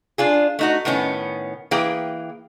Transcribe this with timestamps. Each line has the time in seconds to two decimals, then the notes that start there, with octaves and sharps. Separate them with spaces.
0.18 D4 F4 G#4
0.59 A3 D#4 F#4
0.85 A2 D#3 B3 C#4
1.71 E3 A#3 G#4 G5